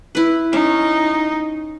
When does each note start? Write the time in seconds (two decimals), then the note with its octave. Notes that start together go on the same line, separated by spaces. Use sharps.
0.15 E4 B4
0.53 C#4 D#4